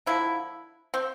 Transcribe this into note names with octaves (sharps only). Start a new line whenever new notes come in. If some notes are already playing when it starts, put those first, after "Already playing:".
D3 F3 A#3 E4
C4